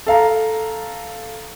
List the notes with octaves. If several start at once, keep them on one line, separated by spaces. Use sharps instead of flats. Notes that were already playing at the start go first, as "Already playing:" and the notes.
A4 F5 A#5